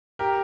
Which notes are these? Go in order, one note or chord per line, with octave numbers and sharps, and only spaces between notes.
G4 A#4